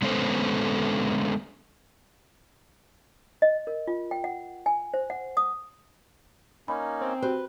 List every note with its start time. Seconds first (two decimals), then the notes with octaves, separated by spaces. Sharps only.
0.02 D3 G#3 B3 C#4 A4 C5
3.42 D#5
3.67 A#4
3.87 F4
4.11 G5
4.24 F#5
4.66 G#5
4.94 C5
5.10 F#5
5.37 D#6
6.68 A#3 C#4 D#4 A#5 B5
7.01 C4
7.22 F#4 G4 B4 C5